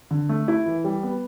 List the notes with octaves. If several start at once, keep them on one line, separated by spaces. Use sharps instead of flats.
D3
A3
E4
E3
G3
B3